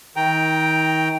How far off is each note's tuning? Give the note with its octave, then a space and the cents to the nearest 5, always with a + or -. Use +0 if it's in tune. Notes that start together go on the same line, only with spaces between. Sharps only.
D#3 +35 G5 +0 A#5 +0